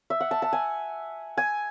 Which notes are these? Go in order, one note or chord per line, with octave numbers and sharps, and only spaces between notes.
E5
F#5
A5
A5
G#5
G#5